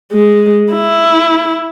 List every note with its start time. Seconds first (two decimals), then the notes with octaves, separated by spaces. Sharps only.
0.12 G#3
0.73 E4